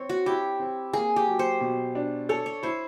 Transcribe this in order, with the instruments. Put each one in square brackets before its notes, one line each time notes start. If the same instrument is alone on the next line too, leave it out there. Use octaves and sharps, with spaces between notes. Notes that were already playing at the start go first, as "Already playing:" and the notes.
Already playing: [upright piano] C4 [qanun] C#5
[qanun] F#4
[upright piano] E4 [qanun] G4
[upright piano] C4
[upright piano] A#3 [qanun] G#4
[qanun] G4
[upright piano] F#3
[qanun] C5
[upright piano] B2
D4
[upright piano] A4 [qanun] C#5
[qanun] C#5
[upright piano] E4 [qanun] C5